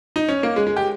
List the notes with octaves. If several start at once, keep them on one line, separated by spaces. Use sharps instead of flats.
D#4
C#4
A#3
G#3
G#3
G4